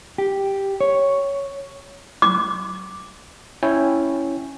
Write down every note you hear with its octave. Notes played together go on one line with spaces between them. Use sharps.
G4
C#5
D6
C#4 E4 C#5 G5 G#5